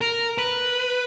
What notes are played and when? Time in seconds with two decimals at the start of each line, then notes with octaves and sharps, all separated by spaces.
0.01 A#4
0.38 B4